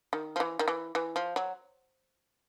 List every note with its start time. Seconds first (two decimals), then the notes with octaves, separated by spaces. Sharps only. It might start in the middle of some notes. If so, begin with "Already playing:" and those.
0.13 D#3
0.36 F3
0.40 E3
0.59 D#3
0.68 E3
0.95 E3
1.16 F3
1.36 F#3